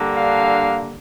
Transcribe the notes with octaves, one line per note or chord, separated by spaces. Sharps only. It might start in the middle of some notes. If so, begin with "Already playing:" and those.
Already playing: D3 G3 A#3 D4
F5